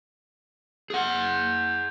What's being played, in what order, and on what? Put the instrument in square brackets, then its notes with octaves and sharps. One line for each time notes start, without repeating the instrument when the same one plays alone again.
[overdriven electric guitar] G#4 F#5